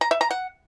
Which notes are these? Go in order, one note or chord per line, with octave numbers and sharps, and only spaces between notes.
A#5
E5
A#5
F#5